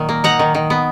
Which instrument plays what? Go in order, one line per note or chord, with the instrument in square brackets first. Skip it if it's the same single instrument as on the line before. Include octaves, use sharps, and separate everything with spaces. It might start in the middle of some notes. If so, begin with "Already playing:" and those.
Already playing: [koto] A#2 D#3 F#3
A#3
D#4 F#5 A#5
D#3
D#3
B3